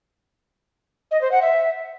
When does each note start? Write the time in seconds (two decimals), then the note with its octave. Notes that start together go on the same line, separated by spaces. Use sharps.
1.11 D#5
1.21 C5
1.32 F#5
1.42 E5